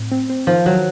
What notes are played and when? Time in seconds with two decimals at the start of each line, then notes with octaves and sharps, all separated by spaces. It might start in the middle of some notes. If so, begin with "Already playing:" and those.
Already playing: A2 C4
0.12 C4
0.30 C4
0.47 D#3 F3
0.65 D#3 F#3